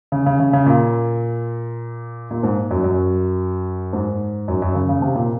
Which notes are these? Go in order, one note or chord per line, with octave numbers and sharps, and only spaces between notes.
C#3
C#3
C#3
C#3
A#2
A#2
G#2
F#2
F#2
G#2
F#2
F#2
C#3
C#3
C3
A#2